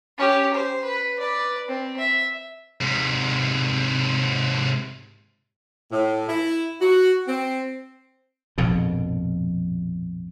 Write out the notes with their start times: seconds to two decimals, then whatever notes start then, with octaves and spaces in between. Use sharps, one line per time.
0.18 C#4 G4
0.54 C5
0.85 B4
1.19 B4 D5
1.69 C4
1.98 E5
2.81 G#2 C3
5.91 A2
6.28 E4
6.80 F#4
7.27 C4
8.58 A#1 F2 G#2 B2